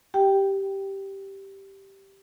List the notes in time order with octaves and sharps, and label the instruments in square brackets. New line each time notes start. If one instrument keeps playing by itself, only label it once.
[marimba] G4 G5